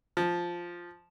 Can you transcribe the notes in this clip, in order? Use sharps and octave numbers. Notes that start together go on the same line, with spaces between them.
F3